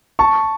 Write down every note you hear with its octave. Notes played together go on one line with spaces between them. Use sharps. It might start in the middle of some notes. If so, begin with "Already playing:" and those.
A5 C#6